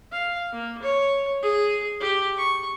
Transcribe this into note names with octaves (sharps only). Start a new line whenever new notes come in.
F5
A#3
C#5
G#4
G4
C#6